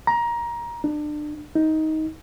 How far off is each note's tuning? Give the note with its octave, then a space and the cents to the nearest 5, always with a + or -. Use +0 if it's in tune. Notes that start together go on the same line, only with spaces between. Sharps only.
A#5 +20
D4 +30
D#4 +15